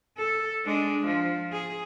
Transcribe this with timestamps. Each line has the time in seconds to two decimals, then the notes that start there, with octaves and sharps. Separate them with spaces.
0.17 A4
0.65 G#3 D4
1.06 F3
1.52 G#4